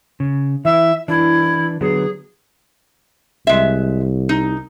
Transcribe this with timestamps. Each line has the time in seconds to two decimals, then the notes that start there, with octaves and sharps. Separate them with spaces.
0.20 C#3
0.65 E3 E4 E5
1.08 E3 D4 E4
1.81 D3 F#3 B3 G#4
3.47 C2 G#3 E5
4.29 D#4